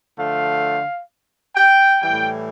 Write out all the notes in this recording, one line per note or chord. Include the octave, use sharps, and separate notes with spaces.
D3 F3 A3 F5
G5
A2 E3 G3 G5